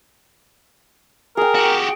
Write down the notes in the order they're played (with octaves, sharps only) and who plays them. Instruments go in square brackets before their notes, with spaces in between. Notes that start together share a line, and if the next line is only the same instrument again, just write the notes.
[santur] G#4 G5 [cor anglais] A#4
[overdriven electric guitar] F#4 G4